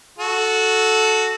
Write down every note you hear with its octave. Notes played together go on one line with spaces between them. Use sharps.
F#4 A4